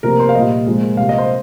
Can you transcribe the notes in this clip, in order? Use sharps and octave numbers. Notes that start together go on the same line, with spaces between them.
C3 F3 A#3 A#4
C5
F5
A#2 G3 A#3 D#5
A#2 F3 G#3
C3 G3 A#3 F5
D#5
C5